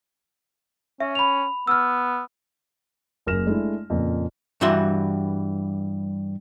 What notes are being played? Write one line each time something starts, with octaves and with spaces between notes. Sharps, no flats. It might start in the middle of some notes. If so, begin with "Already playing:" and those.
C#4 E5
B5 F7
B3 E6 F6
F#1 F#2 A#3 F6 A#6 E7
G#3 A3 D4 E4
F2 A#2 C#3
G2 E3 G3 F#4 E5 C6